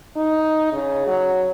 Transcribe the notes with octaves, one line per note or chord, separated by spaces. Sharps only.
D#4
C#3
F#3